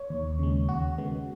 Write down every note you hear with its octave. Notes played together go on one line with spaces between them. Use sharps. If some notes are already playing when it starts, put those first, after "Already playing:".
Already playing: C#5
D#2
C#3 G#3
D#2 F#4
C#3 G#3 B3